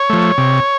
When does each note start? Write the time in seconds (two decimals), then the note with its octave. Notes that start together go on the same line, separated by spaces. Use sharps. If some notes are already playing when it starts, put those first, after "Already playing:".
Already playing: C#5
0.10 F3 A3
0.38 C3